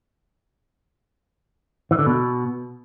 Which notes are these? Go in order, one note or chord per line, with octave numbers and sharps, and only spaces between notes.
E3
D3
B2